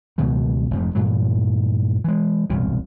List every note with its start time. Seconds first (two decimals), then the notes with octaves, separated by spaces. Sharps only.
0.18 C#2 B2 D#3 F#3
0.71 F1 F2 G#2
0.95 G2 A#2 E3 F#3
2.04 E3 G#3
2.50 E1 C2 G2 A#2